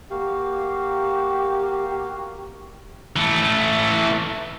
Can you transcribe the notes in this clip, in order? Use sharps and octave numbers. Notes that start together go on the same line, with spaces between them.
A#3 F#4 G4 F5
E3 A3